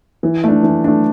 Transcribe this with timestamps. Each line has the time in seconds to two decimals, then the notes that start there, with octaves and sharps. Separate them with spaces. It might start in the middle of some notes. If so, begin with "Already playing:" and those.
0.23 E3
0.44 A3 D4
0.63 E3
0.84 A3 D4